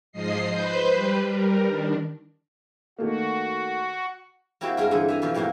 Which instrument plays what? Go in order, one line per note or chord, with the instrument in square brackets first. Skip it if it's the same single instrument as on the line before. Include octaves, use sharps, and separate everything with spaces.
[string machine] G#2 F3 D#5 C7
B4 C5 G6
G3 B4
G3 A#4
D#3 D4
[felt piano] D#3 A3 A#3 [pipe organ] F#4
[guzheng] A#3 C4 E4 F#4 G4
G2 G#3 D4 F4 A#4
D3 E3 D#4 E4
E5 G#5 A#5
B2 E3 F3
F2 A2 F#3 A#3 G4